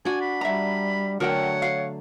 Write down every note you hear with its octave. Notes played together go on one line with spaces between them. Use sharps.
D4 F#4 G#5
B5
G3 E5 A#5
D3 F#3 A3 A#4 C#5 F#5 G5
F5